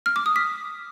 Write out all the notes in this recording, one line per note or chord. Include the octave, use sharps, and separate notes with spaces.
F6
D6
D#6
B6